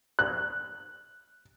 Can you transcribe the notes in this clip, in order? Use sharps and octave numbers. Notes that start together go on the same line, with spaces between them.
F#6